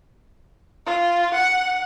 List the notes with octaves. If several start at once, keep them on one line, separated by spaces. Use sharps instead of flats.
F4
F#5